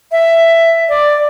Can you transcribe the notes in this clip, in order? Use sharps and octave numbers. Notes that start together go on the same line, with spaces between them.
E5
D5